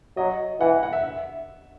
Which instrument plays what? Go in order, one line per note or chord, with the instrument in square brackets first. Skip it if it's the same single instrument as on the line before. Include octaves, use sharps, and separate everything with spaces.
[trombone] F#3 [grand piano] D#5
[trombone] E3 [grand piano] F#5
[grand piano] F#5
E5
E5